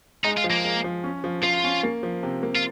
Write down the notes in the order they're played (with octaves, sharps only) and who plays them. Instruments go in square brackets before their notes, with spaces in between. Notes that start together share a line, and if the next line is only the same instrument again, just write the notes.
[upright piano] G#3 [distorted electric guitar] D#4
[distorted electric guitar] F4
[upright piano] F3
[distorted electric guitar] A#3
[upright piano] G#3
F3
C#4
F3
[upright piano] F3 [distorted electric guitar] F4
[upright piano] C#4
A#3
F3
C3
A#3
[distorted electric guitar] F4